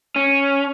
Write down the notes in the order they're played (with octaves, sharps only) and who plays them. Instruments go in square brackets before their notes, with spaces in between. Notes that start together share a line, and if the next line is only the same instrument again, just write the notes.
[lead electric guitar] C#4